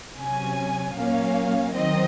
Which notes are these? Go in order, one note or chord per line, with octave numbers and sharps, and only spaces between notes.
C3 F#3 C#4 G#5
A#2 F#3 A#3 C#4 F5
D#3 F#3 C4 D#5